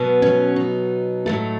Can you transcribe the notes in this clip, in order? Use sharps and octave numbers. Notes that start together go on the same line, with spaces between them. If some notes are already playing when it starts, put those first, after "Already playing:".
Already playing: B2 F#3 B3
C#4
D#4
A2 F#3 A3